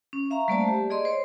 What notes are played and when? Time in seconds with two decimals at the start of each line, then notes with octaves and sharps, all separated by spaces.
0.13 C#4
0.30 E5 F5 A#5 C#6
0.48 G3 A3 A#3 C5 D5 A5
0.68 G4
0.90 G#4 D5 D#5 C6
1.05 C5 C#5